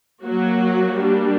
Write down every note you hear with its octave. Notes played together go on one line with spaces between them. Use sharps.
F#3 A#3 F#4
G3 A#3 D4